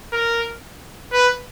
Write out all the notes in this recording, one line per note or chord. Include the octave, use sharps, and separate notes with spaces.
A#4
B4